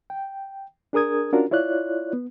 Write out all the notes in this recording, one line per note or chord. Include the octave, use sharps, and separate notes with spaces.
G5
D4 G#4 A#4 D#6 G#6
C#4 D4 F4 F#4 A#4
E4 F4 C#5 D5 F#6
B3